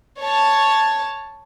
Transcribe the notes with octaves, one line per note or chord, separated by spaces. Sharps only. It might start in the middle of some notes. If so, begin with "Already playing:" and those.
C#5 A5